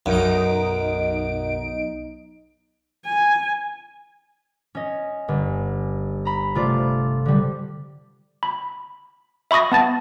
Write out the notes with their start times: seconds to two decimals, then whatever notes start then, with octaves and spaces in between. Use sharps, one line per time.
0.06 B1 F#2 D#4 D7
3.05 G#5
4.75 C#4 D#5
5.28 G1
6.25 A#5 B5
6.55 C3 A3 F4 D5
7.25 D3 G3
8.43 B5
9.51 E5 B5 C#6 D#6 A#6
9.72 B3 A5 A6